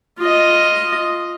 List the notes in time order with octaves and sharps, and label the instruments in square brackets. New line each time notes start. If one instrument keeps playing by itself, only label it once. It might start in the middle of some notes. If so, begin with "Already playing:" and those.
[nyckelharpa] F4 D#5